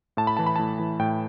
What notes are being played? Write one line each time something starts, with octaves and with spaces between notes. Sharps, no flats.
A2 A5
B5
E3 A5
B5
A2 A5
E3
A2 G5